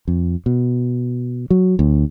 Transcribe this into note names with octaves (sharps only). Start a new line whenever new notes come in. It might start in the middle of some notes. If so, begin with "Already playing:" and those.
F2
B2
F#3
D2